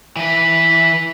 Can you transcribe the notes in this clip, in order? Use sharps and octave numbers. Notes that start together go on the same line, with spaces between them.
E3 B4